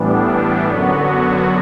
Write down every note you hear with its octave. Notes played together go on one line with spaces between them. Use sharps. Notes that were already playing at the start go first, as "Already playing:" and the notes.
Already playing: A2 E3 G3 B3 D4
F#2 D3 F#3 B3 F#4